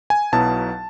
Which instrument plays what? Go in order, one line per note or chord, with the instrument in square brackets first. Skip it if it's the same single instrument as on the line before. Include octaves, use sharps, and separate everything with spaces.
[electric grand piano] G#5
B1 B2 F#3 B3 E4 A5